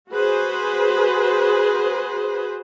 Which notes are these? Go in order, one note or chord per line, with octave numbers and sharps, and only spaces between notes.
F#4 G#4 B4 C5